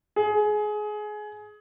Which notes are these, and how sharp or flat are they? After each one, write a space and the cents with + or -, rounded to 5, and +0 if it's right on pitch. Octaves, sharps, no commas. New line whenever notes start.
G#4 +20